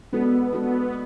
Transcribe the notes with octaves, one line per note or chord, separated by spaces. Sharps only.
G#3 B3 D4 F#4 A4
G#3 D4 F#4 A4